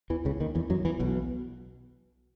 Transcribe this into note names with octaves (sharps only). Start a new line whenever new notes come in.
E2 E3
C#2 C#3
D#2 D#3
E2 E3
F#2 F#3
E2 E3
B1 B2